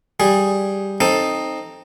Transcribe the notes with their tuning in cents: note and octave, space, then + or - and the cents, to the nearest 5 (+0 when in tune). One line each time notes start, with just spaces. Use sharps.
G3 +0 G#4 +0
C4 +15 D#4 +0 A4 +0